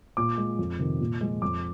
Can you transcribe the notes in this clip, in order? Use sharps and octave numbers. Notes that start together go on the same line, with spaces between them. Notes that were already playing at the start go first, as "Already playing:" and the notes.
A#2 D6
G#3
F2
C3 D#3
A#2
F3 G#3
F2 D6